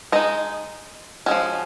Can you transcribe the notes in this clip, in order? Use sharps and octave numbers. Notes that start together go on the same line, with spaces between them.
G#3 D#4 D#5
F3 G#3 C#4 F#4